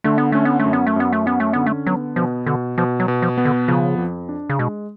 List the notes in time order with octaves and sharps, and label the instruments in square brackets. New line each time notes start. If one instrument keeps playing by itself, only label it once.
[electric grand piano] D3 [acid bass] A3
[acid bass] B3
[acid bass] A3 [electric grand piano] C#4
[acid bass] B3
A3
[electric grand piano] F#2
[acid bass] B3
A3
[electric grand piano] F#2 [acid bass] B3
[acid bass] A3
[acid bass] B3 [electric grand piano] C#4
[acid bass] A3
[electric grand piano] D3 [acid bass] B3
[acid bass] A3
[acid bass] F#3 [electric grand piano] B3
[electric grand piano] B2 [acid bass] F3
[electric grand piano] B2 [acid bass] D3
[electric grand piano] B2 [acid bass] F3
[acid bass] F#3
[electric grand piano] B2
[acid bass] F3
[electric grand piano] B3
[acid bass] D3
[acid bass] C#3 [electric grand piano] F3
[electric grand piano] F2
D4
[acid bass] C#3
[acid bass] B2 [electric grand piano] G#3